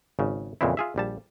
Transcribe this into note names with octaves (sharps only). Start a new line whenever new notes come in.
G#1 C#3
F2 A#2 C#3 E3 C4 E4
F4 G#4 E5
A#1 G3 A5